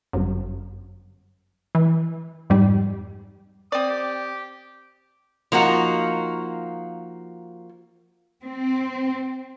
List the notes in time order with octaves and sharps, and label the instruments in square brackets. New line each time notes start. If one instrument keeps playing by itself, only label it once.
[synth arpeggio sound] G1 F#2
E3
F2 G#2 G3
[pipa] C4 D5 [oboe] D#6
[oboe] G4
[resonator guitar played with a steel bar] F3 A#3 D#4 F#4
[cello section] C4